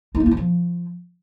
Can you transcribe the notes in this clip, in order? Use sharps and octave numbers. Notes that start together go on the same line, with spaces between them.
D#4
A#3
E4
F#3
F3